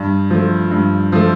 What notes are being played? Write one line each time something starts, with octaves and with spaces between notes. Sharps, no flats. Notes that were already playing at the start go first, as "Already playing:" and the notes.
Already playing: G2
F3 A3
G2
F3 A3